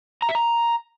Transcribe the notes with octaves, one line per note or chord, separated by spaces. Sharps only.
A#5
E5
A#5